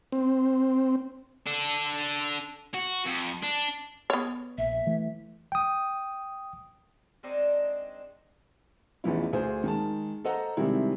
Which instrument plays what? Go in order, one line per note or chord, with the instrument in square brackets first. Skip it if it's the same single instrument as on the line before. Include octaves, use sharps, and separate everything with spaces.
[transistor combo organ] C4
[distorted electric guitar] D4 A4
F#4
F2
D4
[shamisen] B3 C#5
[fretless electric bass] A#1 [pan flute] E5
[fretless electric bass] E3 A3
[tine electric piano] G5 D#6
[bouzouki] G#3 C4 D4 D#4
[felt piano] A1 E2 F3 E4
D2 G#4 C5
D#3 G#3 A5
A4 C5 D#5 F#5 A#5
C3 D#3 G3 G#3 C4 E4